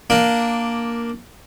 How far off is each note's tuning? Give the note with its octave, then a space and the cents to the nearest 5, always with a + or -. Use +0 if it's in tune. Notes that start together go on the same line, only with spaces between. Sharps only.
A#3 +0 D4 +0